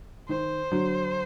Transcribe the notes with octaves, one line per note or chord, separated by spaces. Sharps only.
D#3 C5
D3 F#3